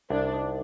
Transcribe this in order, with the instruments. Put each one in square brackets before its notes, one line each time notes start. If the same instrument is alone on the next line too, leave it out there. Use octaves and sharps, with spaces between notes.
[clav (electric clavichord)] C2 [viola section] D4
[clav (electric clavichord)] D#4